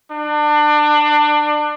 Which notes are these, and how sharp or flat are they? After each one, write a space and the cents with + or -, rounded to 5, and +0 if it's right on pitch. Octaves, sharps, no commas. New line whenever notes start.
D4 +25